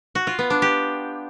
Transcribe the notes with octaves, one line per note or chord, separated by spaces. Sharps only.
F#4
F4
B3
D4
G4